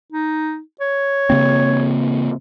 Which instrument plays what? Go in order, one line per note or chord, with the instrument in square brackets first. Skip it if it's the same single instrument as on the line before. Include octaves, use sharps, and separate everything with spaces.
[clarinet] D#4
C#5
[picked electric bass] C#3 A#3 C4